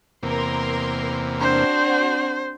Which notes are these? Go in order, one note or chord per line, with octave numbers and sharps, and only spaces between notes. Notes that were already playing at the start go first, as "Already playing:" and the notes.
E2 C3 A#3 A#4 C6
C4 D4 F#4 C5